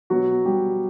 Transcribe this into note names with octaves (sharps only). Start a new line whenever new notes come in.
B2 F#3 F#4
G3 G4